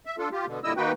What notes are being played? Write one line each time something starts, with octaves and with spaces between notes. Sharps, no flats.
E5
D4 F4 A4
F4 G4
B2 D3
A#2 D3 G3 E4 D#5 E6
D#3 A#3 D#4 F#4 B4 G5